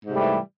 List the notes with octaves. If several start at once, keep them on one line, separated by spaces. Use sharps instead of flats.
G#2 C3 E3 G3 A3